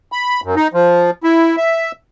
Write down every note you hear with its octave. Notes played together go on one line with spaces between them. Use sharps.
B5
F#2
D#4
F3
E4
E5